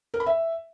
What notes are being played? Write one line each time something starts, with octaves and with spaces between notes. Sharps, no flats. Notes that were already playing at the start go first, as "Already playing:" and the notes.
A#4
B5
E5